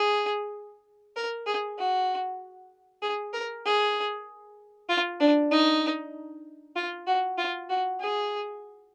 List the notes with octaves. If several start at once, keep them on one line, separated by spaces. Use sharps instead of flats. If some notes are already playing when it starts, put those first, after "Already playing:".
Already playing: G#4
A#4
G#4
F#4
G#4
A#4
G#4
F4
D4
D#4
F4
F#4
F4
F#4
G#4